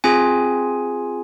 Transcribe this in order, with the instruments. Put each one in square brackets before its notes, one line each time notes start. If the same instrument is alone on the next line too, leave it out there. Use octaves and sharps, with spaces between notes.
[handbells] C4 F4 G#4 G#5